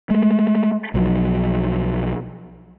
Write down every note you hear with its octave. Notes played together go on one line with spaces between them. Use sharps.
G#3 A3
B1 F3 F#3